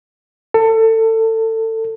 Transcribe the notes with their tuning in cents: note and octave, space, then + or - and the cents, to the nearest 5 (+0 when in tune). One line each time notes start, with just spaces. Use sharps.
A4 +25